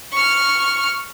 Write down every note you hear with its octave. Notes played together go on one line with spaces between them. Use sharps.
C#6 F6